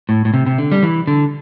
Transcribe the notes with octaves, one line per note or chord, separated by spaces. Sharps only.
A2
A2
C3
C3
D3
G3
E3
D3